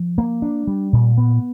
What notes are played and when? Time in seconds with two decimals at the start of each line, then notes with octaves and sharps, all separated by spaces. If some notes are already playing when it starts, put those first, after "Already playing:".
Already playing: F3
0.18 A#3
0.42 D4
0.67 G3
0.93 A#2
1.18 B3